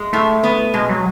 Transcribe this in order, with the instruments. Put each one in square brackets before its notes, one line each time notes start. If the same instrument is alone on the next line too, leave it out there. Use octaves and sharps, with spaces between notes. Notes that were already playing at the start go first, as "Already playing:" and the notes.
Already playing: [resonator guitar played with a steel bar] G#3
[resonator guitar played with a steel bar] A2 [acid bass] A3
[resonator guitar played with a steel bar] B3
[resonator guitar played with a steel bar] B2 [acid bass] G#3
[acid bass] F#3